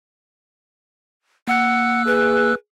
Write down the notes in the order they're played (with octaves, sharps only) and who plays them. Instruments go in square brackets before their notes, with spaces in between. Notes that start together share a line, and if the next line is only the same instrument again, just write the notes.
[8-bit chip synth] A#3 E6 F#6 [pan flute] F#5
[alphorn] G#4 [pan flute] B4